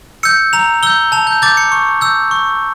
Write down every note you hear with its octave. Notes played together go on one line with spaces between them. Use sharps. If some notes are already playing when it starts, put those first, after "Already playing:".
E6 G6 C#7
A#5 F7
E6 G6 G7
A5 F7
G6
D6 G6 A6
C#7
C#6
E6 G6
C#6